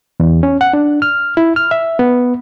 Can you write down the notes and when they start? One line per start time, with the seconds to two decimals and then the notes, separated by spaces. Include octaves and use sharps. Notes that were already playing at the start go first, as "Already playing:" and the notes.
0.20 E2
0.43 C#4
0.61 F#5
0.73 D4
1.02 F6
1.37 E4
1.56 F6
1.71 E5
1.99 B3